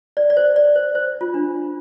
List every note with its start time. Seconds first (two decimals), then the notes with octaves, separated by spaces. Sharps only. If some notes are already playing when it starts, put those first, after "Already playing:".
0.17 D5
0.30 D5
0.37 C5
0.56 D5
0.76 C5
0.95 C5
1.21 F4
1.34 D4